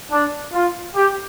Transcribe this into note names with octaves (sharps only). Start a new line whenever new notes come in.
D4
F4
G4